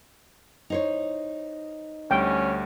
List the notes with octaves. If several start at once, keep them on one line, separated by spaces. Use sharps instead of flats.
D#4 C5 C#5
D2 G3 C#4 G5